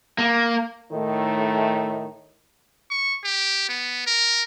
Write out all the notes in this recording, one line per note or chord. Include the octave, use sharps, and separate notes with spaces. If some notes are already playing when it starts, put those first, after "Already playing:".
A#3
A2 D#3 A3
C#6
G4
B3
A#4